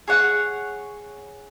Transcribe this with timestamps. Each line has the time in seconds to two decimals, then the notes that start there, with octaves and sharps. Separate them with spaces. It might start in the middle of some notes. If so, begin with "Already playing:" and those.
0.08 G#4 C#5 F#5